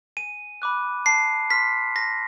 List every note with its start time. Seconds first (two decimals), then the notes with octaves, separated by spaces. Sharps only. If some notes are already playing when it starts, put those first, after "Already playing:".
0.17 G#5 D#7
0.62 B5 D6 F#6
1.06 A5 C7
1.50 C6 F6 B6
1.96 A5 A#6